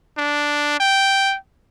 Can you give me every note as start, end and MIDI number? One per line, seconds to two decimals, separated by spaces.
0.18 0.76 62
0.80 1.36 79